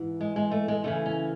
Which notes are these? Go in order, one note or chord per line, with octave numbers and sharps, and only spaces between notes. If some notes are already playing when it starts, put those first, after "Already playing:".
Already playing: G#2 E3
G#3
G#3
A3
G#3
D2 C#3 E3 A3
C#4